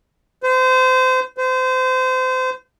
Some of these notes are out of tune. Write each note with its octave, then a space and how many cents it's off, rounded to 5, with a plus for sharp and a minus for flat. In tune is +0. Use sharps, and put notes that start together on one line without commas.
C5 -30
C5 -30